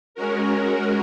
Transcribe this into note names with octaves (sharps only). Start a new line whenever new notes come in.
G#3 C#4 F#4 A#4